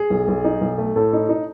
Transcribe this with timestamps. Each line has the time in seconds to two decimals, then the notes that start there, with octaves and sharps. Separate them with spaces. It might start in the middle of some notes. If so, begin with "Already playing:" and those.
Already playing: G#4
0.10 B1
0.28 B1
0.44 D#4
0.61 B1
0.78 A3
0.96 A2 A4
1.13 D#4
1.29 D#4